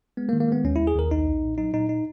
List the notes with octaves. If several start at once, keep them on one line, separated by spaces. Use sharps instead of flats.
G#3 B3
A#3
D#3
A#3
G#3 B3
D#2 C#4
D#2 E4
G#4
D#2 A#4
B1 D#4
B1
A#2
F#3 D#4
A#2 D#4
D#4